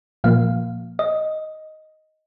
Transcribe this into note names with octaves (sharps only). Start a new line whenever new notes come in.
A#2 F3 A#3 F5
D#5